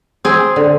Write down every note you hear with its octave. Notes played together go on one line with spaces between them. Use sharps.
C4 G#4
D3